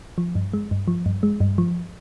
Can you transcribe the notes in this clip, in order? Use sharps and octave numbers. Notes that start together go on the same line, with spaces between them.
F3
G2
G#3
G2
F3
G2
G#3
G2
F3